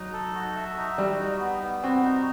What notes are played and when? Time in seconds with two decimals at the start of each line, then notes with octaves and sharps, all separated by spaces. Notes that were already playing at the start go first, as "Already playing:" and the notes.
Already playing: F#3 D#4
0.13 A4
0.35 F#4
0.56 E5
0.77 D#4
0.98 G3 F#4
1.19 D#4
1.40 B3
1.63 B3
1.83 C4 F#4
2.04 D#4